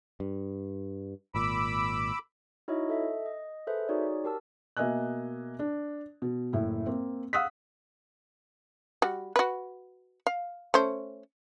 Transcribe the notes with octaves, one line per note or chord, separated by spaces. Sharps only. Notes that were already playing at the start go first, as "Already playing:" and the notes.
G2
G#1 A#2 B5 D6 E6
D#4 E4 F#4 C#5 D#5 E5
A4 D#5 E5
D#5
G#4 A4 B4 C5 E5
D#4 F#4 G#4 C#5 D5
G4 A#4 A5 E6
B2 A#3 D#5 E5 G#5 F#6
D4
B2
F#1 A2 E4
A#3 C4
F5 F#5 D#6 E6 F#6 B6
G3 F#4
F#4 B4
F5
A3 C#4 C5